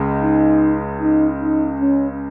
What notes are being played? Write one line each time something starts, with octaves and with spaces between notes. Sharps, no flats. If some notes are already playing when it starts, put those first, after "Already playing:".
Already playing: C#2 C#3 G#3
D#4
D#4
D#4
C#4